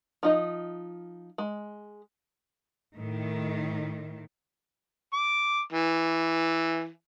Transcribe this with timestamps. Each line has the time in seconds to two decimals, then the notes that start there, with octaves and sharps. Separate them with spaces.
0.23 F3 D#4 D#5
1.38 G#3
2.96 A2 D#3
5.14 D6
5.72 E3